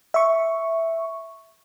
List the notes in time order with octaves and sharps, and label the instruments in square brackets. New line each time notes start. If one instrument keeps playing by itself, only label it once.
[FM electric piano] E5 C#6